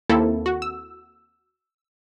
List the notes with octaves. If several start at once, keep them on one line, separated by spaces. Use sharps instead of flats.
D#2 A#3 C4 E4 A4
F#4
E6